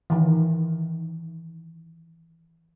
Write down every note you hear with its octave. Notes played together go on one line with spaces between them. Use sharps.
D#3 E3